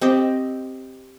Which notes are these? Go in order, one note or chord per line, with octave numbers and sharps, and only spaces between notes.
C4 G4 D#5